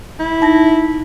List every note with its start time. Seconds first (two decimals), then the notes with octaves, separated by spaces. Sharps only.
0.20 E4
0.41 D#4 A5 A#6